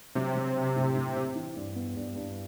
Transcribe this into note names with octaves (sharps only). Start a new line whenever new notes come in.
C3 F#3
F#3
C4
A2
A2
C4
E3
G2
B3
G2
G2